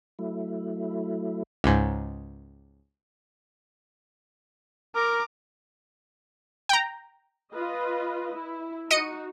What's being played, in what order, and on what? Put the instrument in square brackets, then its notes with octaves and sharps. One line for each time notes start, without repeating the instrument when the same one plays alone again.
[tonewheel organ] F#3 A3 E4
[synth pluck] C#2 G#2
[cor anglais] A#4 [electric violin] A#5 D6
[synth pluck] G5 A#5
[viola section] F4 B4 D#5
E4
[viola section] D#4 F#4 [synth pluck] D#5 C#7 D#7